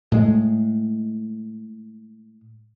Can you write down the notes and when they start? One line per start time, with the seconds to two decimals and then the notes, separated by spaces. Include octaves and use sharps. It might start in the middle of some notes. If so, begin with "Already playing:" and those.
0.12 A2 G#3